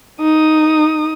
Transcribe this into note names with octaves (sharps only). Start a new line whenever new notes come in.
D#4 D#6